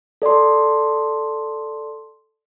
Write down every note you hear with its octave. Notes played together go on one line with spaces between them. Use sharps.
A4 D5 A5 C6